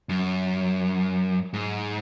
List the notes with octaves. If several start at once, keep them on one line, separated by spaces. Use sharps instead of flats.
F#2
G#2